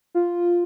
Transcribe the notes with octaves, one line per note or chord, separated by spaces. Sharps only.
F4